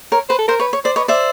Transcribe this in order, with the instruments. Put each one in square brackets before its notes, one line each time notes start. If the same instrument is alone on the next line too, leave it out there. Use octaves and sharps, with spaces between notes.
[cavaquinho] A#4 [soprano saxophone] C#5
[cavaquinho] B4 [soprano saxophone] C5
[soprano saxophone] A4
[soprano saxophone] A#4 [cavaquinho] C5
[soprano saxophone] B4 [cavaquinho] C#5
[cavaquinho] C#5
[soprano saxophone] C5 [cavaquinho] D5
[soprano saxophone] B4 [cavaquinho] C#5 D#5
[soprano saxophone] C5 [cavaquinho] D5 E5